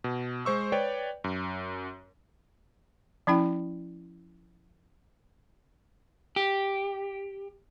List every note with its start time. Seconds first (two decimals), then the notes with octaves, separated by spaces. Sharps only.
0.04 B2
0.45 G#3 C5 C#6 E6
0.72 B4 C#5 D5 G5
1.24 F#2
3.27 F3 C#4 E4 G5
6.36 G4